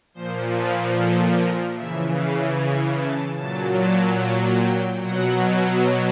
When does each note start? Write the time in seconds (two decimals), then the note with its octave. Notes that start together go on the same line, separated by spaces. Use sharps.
0.14 A#2 F3 C5
0.55 B4
0.96 A4
1.36 A#4
1.76 C#3 E3 E5
2.18 F5
2.58 G#5
2.98 A5
3.39 A#2 F#3 A5
3.79 A5
4.60 G5
5.00 B2 F#3 F#5